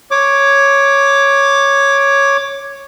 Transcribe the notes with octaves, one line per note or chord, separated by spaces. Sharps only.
C#5 D6